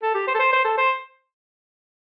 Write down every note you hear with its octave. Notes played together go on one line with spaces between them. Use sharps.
A4
G4
C5
A4
C5
C5
A4
C5